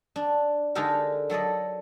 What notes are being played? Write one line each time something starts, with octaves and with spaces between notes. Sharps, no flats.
D4
D3 G#3 D#4 G4 A4 A#4
F#3 A4 D5 D#5